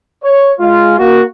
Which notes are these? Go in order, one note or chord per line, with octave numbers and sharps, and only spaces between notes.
C#5
G#3 F4
A#3 F#4